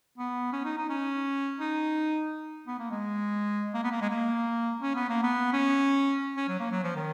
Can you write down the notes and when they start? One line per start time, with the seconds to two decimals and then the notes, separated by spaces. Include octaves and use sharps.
0.18 B3
0.53 C#4
0.65 D#4
0.77 D#4
0.90 C#4
1.60 D#4
2.67 B3
2.79 A#3
2.91 G#3
3.74 A#3
3.84 B3
3.92 A#3
4.01 G#3
4.10 A#3
4.81 C#4
4.96 B3
5.09 A#3
5.23 B3
5.53 C#4
6.36 C#4
6.48 F#3
6.60 A#3
6.72 F#3
6.83 F3
6.96 D#3